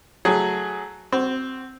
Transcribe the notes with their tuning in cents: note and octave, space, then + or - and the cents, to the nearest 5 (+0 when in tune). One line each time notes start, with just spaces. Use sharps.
F#3 +0 A3 +0 G#4 +5
C4 +0 F#4 +25